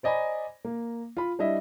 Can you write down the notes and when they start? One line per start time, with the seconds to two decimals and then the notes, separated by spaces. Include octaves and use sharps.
0.03 C5 D5 D#5 G#5 A#5 B5
0.65 A#3
1.17 F4 B5
1.39 G3 D4 E4 D#5 E5